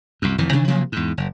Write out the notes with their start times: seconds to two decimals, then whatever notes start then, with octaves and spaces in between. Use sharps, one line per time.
0.22 C2 F#2
0.38 F1 F2 D#3 E3
0.53 C3 D#3 E3 D4
0.67 C3 F3 F#3 A#3
0.92 E2 G#2
1.17 F#1